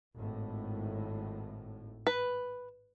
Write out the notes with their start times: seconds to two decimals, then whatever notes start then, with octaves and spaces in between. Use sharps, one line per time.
0.15 G#1 A2
2.07 B4